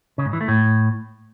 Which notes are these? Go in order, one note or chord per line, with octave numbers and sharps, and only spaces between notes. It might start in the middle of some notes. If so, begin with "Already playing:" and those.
C#3
G#2
E3
A3
A2